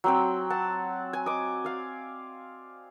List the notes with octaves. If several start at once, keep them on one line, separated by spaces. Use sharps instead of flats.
F#3 C4 G5
F#5 A5
G#5
D#5 D6
D5 F5